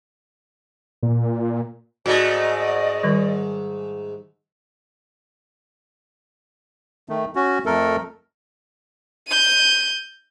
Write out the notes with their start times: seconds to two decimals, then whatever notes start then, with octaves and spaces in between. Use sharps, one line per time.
1.03 A#2
2.06 G#2 A3 F#4 D5 D#5
3.03 D#3 G3
7.09 D#3 A3
7.36 C#4 F#4
7.66 F2 A3 A4 A#4
9.28 G6 D#7